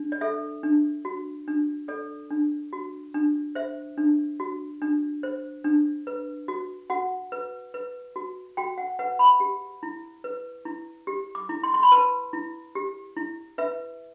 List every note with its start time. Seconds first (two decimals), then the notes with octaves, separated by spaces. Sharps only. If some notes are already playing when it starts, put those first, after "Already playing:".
Already playing: D4
0.12 D5
0.21 A4 E5
0.63 D4
1.05 F#4
1.48 D4
1.88 A4 D5
2.31 D4
2.73 F#4
3.14 D4
3.55 C5 E5
3.98 D4
4.40 F#4
4.82 D4
5.23 C5
5.64 D4
6.07 B4
6.48 F#4
6.90 F#4 F#5
7.32 B4
7.74 B4
8.16 F#4
8.57 F#4 G5
8.78 F#5
8.99 B4 F#5
9.19 B5
9.40 G4
9.83 E4
10.24 B4
10.65 E4
11.07 G4
11.35 D6
11.49 E4
11.63 C6
11.74 C6
11.83 B5
11.92 B4 A5
12.33 E4
12.75 G4
13.17 E4
13.58 B4 E5